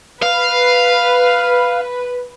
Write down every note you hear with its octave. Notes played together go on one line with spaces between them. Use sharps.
B4 F5